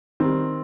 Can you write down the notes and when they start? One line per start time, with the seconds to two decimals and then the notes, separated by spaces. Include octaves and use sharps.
0.20 D#3 G3 C4